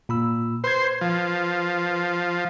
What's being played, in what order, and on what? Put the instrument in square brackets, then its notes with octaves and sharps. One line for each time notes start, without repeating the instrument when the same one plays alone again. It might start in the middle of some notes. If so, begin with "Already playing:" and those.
[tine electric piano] A#2 B5 E6
[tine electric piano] B4 G#6 [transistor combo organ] C5
[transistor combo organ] F3